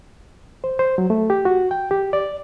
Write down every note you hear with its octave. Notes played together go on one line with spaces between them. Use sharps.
C5
C5
F#3
A3
G4
F#4
G5
G4
D5